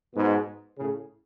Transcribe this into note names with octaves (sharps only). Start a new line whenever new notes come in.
G#2 B2
A2 C#3